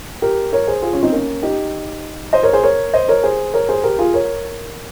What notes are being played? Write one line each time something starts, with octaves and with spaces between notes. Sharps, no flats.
G4 A#4
A#4 C#5
G#4 C5
F4 G#4
C#4 F4
C4 D#4
A#3 C#4
D#4 G4
C5 D#5
A#4 C#5
G#4 C5
A#4 C#5
C5 D#5
A#4 C#5
G#4 C5
A#4 C#5
G#4 C5
G4 A#4
F4 G#4
A#4 C#5